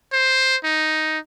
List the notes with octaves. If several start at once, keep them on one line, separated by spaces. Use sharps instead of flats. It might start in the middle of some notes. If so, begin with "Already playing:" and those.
C5
D#4